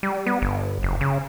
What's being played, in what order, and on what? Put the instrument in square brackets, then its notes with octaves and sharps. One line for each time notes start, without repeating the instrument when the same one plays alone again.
[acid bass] G3
B3
G1
F#1
C#3